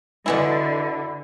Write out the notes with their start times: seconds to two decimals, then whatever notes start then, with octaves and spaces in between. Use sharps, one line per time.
0.26 B2 D3 E3 E4